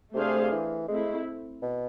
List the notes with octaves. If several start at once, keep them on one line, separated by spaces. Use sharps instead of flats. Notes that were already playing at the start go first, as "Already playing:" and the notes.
C3 A3 D4 G#4 C5 F5
E3
G#3 A3 C4 E4
B2